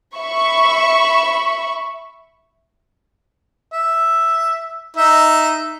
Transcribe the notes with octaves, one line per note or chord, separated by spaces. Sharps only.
E5 B5 C#6
E5
D#4 E5